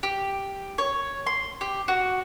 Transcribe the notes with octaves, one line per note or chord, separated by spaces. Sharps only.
G4
C#5
C6
G4
F#4